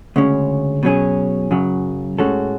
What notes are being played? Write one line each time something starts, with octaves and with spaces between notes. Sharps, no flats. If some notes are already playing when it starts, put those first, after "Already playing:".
D2 C#3 G#3 C#4
B2 F#3 C#4 G#4
F#2 C#3 F#3
A2 G#3 C#4 F#4 A4